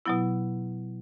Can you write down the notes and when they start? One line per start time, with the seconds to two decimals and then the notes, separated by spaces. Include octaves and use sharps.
0.06 B2 F#3 B3 E4